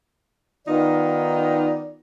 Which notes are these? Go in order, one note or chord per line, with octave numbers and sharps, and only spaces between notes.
D#3 B3 D#4 F4 D5